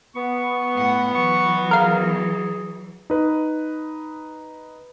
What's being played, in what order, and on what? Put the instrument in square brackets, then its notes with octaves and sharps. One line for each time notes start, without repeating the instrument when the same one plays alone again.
[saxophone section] B3 [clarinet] C#6
[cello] A2 F#5
[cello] E3 F#3 [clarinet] C#6
[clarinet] G#4 [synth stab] A#4 F5
[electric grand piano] D#4 B4